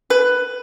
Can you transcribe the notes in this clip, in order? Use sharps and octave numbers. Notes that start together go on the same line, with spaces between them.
B4